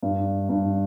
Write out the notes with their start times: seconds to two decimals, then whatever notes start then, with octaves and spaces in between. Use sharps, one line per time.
0.03 G2
0.49 G2